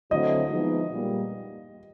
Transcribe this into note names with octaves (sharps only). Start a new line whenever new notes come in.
D3 F#3 A3 C4 E4 D#5
F3 G#3 B3 D#4
A#2 G3 A#3